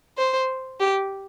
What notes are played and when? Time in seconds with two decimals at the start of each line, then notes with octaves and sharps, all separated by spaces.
0.17 C5
0.80 G4